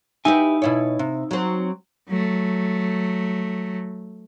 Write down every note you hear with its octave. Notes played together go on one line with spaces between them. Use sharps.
D#4 E4 G4 B4 G#5
B2 E4 C#5
C3
F#3 C4
F#3 A3